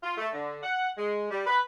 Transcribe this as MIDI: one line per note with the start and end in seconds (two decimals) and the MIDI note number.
0.03 0.15 65
0.18 0.28 57
0.34 0.58 50
0.63 0.90 78
0.97 1.30 56
1.31 1.42 55
1.47 1.59 71